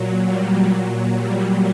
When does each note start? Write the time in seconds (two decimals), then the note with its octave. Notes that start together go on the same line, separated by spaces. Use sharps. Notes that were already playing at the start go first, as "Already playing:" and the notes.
Already playing: A#2 F#3
0.26 G3
0.70 A#2 F#3
1.14 G3